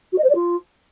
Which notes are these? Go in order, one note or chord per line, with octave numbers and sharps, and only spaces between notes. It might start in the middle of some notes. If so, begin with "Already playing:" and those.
F#4
D#5
C5
D5
F4